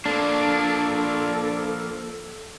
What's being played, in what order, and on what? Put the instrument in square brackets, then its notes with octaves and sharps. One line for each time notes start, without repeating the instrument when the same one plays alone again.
[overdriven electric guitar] F3 A#3 [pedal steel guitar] D4 [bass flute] A4